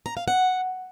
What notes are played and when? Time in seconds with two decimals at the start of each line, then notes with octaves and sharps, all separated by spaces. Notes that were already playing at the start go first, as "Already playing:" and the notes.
0.06 A#5
0.17 F5
0.28 F#5